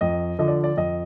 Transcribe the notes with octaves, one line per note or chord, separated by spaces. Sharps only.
F2 D#5
D3 F3 D#5
D5
D5
F2 D#5